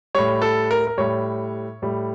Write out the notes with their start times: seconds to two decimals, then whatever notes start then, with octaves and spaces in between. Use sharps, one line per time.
0.15 A2 G3 C#5
0.42 A4
0.71 A#4
0.87 A#4
0.98 A2 G3 C#5
1.82 A2 G3